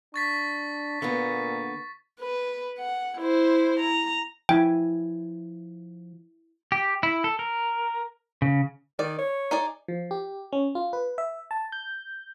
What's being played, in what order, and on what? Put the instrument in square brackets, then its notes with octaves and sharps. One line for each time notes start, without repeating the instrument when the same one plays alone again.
[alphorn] D4 [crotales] C#6 A6 B6
[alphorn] A#2 [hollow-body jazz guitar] D3 A#3 B3
[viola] B4
F#5
E4 C5
A#5
[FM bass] F3 [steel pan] E4 G#5 [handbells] G5
[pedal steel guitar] G4
E4
A4
A#4
C#3
[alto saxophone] D#3 [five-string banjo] D5
[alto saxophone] C#5
[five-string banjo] D#4 G#4 D5
[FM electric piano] F3
G4
C#4
F4
B4
E5
A5
G6